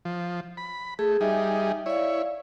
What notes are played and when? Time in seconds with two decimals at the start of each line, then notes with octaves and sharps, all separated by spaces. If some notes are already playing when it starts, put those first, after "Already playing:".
0.05 F3
0.57 B5
0.99 A3 G#4
1.21 G3 D#4 G#4 E5
1.86 E4 C#5 D5 F5